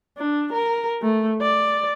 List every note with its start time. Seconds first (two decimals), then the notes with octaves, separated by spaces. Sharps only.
0.17 D4
0.53 A#4
1.02 A3
1.41 D5